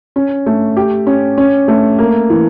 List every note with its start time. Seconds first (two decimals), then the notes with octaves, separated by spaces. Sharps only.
0.16 C#4
0.46 A3
0.77 G4
1.07 C#4
1.38 C#4
1.68 A3
1.99 A#3
2.30 E3